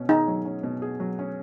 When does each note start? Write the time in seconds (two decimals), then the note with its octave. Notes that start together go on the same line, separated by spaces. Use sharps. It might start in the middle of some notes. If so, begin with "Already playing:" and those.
Already playing: B2 C#4
0.09 D#4 G#4
0.28 F#3
0.45 C#4
0.63 B2
0.82 G#4
1.00 F#3
1.19 C#4